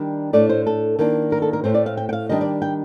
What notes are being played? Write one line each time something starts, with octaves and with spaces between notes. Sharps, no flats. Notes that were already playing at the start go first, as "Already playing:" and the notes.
Already playing: D#3 G3 D4
A2 A3 D4 D5
C5
A4
D#3 A#3 D4
A#4
A4
A#4
A2 A3 C4 C5
D5
F5
G5
G5
F5
D#3 G3 D4 D#5
D5
G5